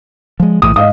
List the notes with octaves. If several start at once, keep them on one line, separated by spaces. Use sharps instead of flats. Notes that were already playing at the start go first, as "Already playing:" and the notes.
F3 G#3
A#1 A2 E3 D#6
G#2 D#5 F5 D#6